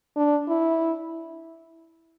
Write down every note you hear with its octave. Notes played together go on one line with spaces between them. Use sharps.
D4
E4